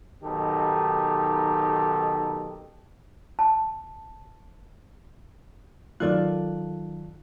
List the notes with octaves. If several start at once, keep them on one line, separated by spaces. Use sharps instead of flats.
B1 D#3 D#4 G4 A4
A5
F#2 D#3 F4 A4 D5 F#6